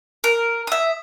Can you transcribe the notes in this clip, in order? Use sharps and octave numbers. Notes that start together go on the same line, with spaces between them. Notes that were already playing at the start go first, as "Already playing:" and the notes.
A#4
E5 D#6